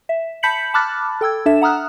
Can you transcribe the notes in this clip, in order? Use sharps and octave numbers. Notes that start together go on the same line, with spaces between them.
E5
A5 B5 G6 B6 C#7 F#7
A5 B5 D6 F6 F#6 A6
A4 G5 E6 G#6
D4 A4 E5 E7
F#5 A#5 D#6 F6 F#6